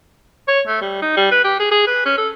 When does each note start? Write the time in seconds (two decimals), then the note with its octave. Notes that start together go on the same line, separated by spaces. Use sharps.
0.48 C#5
0.67 A3
0.81 G3
1.02 D#4
1.17 G3
1.31 B4
1.44 G4
1.60 G#4
1.71 G#4
1.87 B4
2.06 C#4
2.18 A4